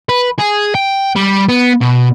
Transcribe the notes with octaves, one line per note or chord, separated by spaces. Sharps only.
B4
G#4
G5
G3
B3
B2